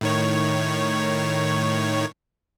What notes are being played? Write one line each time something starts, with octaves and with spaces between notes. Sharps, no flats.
A2 D#3 C#5